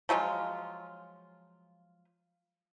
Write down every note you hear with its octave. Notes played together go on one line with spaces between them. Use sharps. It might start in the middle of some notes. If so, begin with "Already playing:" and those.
F3 F#3 G#3 F4